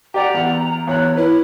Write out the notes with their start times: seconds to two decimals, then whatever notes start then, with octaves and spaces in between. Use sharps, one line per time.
0.14 G4 D5 F#5 A#5
0.34 E2 F#5
0.87 E2 C#5 F#6
1.17 E4 B4